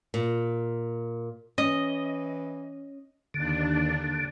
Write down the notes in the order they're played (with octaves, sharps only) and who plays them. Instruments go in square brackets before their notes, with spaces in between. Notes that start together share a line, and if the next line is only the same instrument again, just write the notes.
[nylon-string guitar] A#2
[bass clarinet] E3 [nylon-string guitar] C#4 [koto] D#5
[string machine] D#2 D4 [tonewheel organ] D3